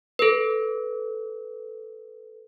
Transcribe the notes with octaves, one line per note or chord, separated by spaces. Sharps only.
A4 B4